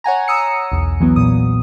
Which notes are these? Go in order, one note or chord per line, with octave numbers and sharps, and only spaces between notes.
C#5 F#5 G#5 A#5
A#5 D#6 E6 C#7
B1 E2
E3 F#3 B3
A#2 D#6